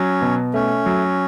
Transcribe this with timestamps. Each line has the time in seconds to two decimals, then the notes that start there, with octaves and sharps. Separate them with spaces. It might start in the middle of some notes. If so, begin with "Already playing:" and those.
Already playing: F#3 C#4
0.21 B2
0.54 A3 C#4
0.86 F#3